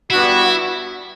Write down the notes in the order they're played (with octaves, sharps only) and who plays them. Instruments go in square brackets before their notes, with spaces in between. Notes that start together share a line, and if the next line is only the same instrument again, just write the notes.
[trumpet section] G3 B3 D4 F#4 [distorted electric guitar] E4